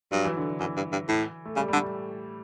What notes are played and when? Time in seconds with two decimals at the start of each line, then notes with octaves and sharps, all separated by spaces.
0.12 G2 F#3
0.24 E3
0.37 D3
0.48 D3
0.60 F#2 E3
0.76 G2
0.92 G2
1.08 A2
1.45 A3
1.56 C#3 G3
1.68 D3 G3
1.76 A2